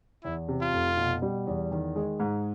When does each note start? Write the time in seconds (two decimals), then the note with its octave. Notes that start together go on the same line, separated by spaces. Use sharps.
0.24 E2 E4
0.48 C3
0.62 F4
0.73 F1
0.97 B2
1.22 G3
1.47 E2
1.71 D#3
1.96 G#3
2.20 G#2